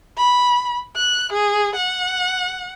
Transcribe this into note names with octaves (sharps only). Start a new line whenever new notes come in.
B5
F#6
G#4
F#5